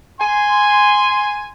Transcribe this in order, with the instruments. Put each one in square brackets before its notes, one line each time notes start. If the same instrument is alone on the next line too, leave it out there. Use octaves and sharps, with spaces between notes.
[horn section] G#5 C6